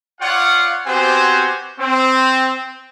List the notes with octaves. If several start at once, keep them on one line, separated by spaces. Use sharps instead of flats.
F4 C#5 D5 F5 F#5
B3 C4 F#4 G4 C5 G#5
C4